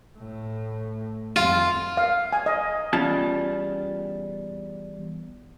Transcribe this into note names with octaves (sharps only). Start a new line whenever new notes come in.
A2
F2 F4
F5
G#5
D#5
E2 G3 C#4 F4 A5